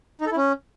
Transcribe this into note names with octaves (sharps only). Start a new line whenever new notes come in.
D#4
A4
E4
C#4